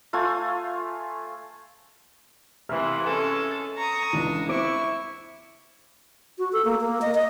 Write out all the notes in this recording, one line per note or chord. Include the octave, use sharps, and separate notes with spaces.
A3 F4 C5 G#5
C3 E3 A#3 E5 F6
G#3 C#4 A4
A#5 C#6 D#6
C#2 E3 D4
C4 E4 C#6 D6 D7
F#4
A4
A#3
A#3
D#5
D#5